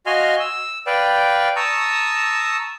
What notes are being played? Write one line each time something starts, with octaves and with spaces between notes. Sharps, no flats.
F#4 D#5 F5 G#5 C6 F6
E6
B4 D5 F5 G5
A5 A#5 C#6 D#6 E6